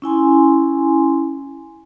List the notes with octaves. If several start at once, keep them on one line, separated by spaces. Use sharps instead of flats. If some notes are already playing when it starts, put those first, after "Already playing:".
C#4 E4 G#5 C6